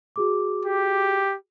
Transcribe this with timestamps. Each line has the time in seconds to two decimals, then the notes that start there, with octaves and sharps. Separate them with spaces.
0.16 F#4 G#4 D6
0.65 G4